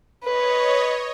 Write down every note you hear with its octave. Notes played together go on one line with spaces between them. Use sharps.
B4 C#5 D#5